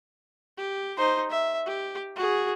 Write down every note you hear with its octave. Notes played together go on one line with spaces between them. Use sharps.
G4
D#4 C5
E5
G4
F#4 G#4